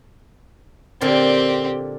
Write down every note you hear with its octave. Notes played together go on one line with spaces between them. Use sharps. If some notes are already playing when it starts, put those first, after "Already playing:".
A#2 D3 C4 G4 A#4